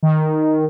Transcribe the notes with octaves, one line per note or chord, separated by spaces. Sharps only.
D#3